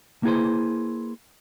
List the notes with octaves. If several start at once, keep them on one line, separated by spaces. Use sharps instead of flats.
A#3 B3 E4 G#4 B4 C5